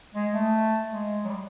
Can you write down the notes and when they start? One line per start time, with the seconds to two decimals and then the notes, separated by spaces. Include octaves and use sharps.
0.14 G#3
0.33 A3
0.91 G#3
1.25 F#3
1.29 G3